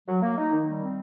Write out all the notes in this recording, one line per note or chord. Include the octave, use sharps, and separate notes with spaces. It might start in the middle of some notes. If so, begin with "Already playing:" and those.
F#3
A#3
D#4
D#3
G3
C4